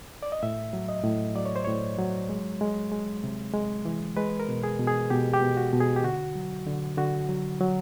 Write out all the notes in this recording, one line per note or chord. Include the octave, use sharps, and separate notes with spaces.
D5
D#5
A2 E5
F#3
D#5
A2
F#3 D5
C#5
C5
A2 C#5
F#3
G#3
G#3
G#3
C3
G#3
E3
G#3 B4
A#4
B2
G#4
B2
G#4
B2 G4
G4
B2
F#4
B2
G#4
G4
D3 F#4
F#3
D3
D3 F#4
F#3
F#3